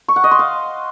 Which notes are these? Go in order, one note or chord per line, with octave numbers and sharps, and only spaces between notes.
C#6
F#5
D#5
C6
F5